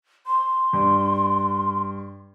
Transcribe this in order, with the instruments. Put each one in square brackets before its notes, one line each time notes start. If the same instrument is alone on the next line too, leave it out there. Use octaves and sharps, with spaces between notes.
[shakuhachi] C6
[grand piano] G2